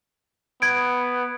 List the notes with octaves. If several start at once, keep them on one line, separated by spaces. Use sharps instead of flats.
B3 G#6 D7